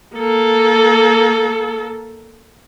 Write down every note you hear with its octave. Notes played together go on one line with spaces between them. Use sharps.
A#3 A4